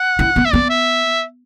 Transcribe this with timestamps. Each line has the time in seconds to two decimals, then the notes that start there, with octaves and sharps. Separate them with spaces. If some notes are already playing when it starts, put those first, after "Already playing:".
Already playing: F#5
0.19 E4
0.36 B3
0.45 E5
0.52 B3 D5
0.70 E5